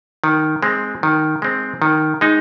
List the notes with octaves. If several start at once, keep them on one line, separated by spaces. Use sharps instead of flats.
D#3
G#3 C4
D#3
G#3 C4
D#3
G#3 D#4